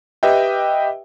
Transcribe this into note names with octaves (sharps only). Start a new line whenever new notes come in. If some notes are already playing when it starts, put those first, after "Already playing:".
G4 B4 D#5 E5 G5